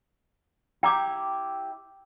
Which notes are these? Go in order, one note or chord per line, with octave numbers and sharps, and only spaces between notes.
E4 G4 G5 A#5 D6